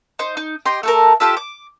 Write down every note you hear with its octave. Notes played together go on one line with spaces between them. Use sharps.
D#4 C5
D#4
G4 D#5 G5 C6
A3 A4 A#4
F4 G4 A4 E5
D6